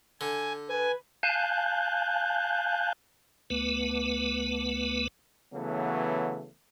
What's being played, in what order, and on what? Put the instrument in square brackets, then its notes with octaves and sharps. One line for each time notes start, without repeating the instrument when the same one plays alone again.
[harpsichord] D3 [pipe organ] G#5
[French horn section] B4 [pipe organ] G#5
[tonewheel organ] F5 G#5 A5 F#6 G6
D2 A3 B3 B4
[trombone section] C#3 E3 F#3 A3 B3